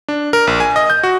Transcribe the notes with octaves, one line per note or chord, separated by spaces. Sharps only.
D4
A#4
A#1
G#5
D#5
G6
F#4